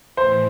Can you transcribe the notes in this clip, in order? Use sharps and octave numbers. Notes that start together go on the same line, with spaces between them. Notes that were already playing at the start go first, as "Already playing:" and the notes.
A2 E3 C5